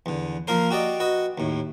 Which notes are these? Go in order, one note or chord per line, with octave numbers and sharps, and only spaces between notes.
E2 D3
F3 A#3 A#4 C5
F#4 G4 D5 D#5
F#4 B4 D#5
D#2 A2